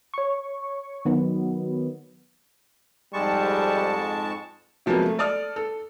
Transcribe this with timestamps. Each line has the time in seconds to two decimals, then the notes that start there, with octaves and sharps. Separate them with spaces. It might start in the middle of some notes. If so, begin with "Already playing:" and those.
0.14 C#5 C#6
1.05 D#3 F#3 B3
3.13 F2 G#2 G3 G#3 A5 C#6
4.86 C3 F3 F#3 G#3 A#3 B3
5.06 A3
5.19 A4 D5 A5 D#6 F6
5.56 A4